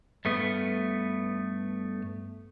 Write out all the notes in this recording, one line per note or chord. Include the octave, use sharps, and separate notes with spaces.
G2 A3 B3